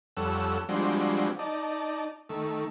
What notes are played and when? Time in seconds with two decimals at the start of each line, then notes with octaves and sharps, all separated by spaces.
0.17 F2 G3 C#4 A4 F#5 E6
0.69 F3 G3 G#3 C4 D4 F#4
1.39 D#4 D5 A5
2.29 D#3 A3